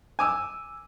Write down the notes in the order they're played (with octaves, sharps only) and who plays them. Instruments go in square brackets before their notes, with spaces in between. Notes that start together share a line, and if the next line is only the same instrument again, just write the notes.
[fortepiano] G#5 D6 E6